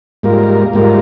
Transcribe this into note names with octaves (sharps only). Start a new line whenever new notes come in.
G#2 G3 A#3 F4 A#4
G#2 G3 A#3 F4 A#4